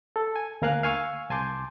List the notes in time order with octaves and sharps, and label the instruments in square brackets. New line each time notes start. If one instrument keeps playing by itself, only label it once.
[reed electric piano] A4
G#5
D2 A#3 A#4 F5 G#5 F#6
F5 G#5 C#6 E6
C2 G#5 A5 C6 D6 G6